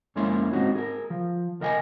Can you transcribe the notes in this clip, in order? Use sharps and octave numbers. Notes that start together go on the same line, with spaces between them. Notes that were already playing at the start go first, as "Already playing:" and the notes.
F2 G#3 A#3 C#4 E4 C6
G#2 C4 D#4 F#4
G#4 A#4
F3
D2 A#4 D#5 G5 G#5